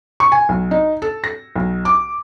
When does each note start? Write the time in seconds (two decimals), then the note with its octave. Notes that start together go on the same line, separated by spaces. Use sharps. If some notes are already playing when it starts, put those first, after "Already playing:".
0.20 C#6
0.32 G#5
0.49 B1
0.71 D#4
1.02 A4
1.24 A#6
1.56 B1
1.85 D6